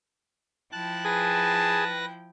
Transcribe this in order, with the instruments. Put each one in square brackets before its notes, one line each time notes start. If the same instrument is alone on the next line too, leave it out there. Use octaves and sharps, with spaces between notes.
[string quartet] F3 E4 G5 [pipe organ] A5 F#6
[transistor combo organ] G#4 [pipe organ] B4 A#6 [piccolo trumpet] A5